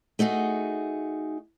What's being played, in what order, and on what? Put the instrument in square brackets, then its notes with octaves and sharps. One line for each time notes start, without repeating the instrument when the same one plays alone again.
[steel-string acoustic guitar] A3 D#4 F#4 G#4